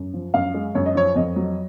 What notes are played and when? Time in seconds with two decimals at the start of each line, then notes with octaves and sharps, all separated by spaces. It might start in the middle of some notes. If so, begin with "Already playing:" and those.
Already playing: F#2
0.14 F3
0.34 F#2 F5
0.54 G#3
0.75 F#2 C#5
0.86 D#5
0.95 F3 C#5
1.16 F2 D#5
1.36 F#3